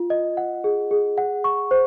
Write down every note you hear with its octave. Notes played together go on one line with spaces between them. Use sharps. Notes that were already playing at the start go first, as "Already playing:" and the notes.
Already playing: F4
D#5
F#5
G#4
G#4
F#5
C#6
C5